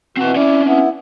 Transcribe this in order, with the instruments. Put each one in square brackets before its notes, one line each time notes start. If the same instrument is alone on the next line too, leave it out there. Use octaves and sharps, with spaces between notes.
[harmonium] B2 E3 F#4 [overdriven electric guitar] C4 A5
[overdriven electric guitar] C#4 D4 [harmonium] E4 D5
[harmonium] B3 E4